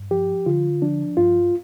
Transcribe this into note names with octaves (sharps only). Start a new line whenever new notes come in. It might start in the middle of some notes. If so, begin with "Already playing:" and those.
Already playing: G2
F3 G4
D3 F4
F3 D4
G2 F4